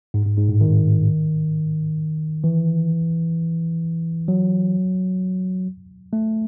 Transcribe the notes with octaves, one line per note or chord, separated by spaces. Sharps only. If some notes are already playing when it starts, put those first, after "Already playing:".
G#2
G#2
G#2
A2
D#3
E3
F#3
A3